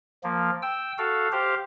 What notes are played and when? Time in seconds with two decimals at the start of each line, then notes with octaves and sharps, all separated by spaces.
0.24 F3 A#3
0.62 G5 E6
0.98 F#4 A4 F5
1.32 G4 C5 F5